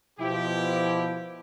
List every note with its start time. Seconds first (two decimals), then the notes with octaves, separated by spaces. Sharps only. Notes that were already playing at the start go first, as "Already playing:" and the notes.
0.20 B2 F3 E4 G4